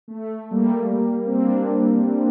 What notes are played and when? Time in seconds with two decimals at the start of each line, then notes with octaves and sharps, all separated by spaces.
0.08 A3
0.51 G3 A#3
1.26 C4
1.37 A#3 D4